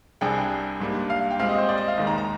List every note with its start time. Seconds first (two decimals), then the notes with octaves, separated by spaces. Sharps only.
0.21 C2 C3 G3 D4 G#4 G5
0.80 G#2 G3 A#3 D4
1.10 F5
1.31 G5
1.39 A#2 G#3 C4 G4 F5
1.49 D#5
1.58 C5
1.69 D5
1.78 D#5
1.88 F5
1.98 D#2 D#3 G#3
2.07 A#5
2.18 A#5